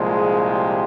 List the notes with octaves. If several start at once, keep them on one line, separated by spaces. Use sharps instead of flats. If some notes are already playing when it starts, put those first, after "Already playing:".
Already playing: C2 A#2 F3 G#3
G#4
G4